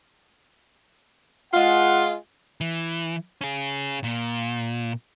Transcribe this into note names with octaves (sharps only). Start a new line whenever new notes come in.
G#3 F4 F#5
E3
C#4 G#4
A#2